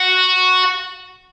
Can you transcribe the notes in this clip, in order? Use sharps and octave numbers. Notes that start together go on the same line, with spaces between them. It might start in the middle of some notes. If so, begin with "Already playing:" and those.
Already playing: F#4